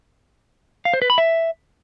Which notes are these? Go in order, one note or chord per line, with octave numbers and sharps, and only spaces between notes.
F5
C5
B4
B5
E5